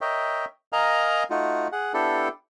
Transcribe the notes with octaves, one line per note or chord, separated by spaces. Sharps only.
A#4 C#5 D#5 E5 G5
A#4 D#5 F5 G#5 A#5
A3 D#4 F4 F#4
G#4 F#5
B3 D4 E4 G4 A4